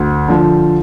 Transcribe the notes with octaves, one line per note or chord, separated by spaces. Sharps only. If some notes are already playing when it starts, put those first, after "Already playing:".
Already playing: D2
D3 F3